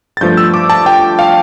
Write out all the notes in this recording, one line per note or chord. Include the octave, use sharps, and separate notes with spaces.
A6
G2 F3 A3 G6
E6
D6
A5
G5
F5